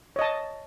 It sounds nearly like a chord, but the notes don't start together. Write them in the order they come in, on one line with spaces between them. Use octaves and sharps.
C#5 D#5 A5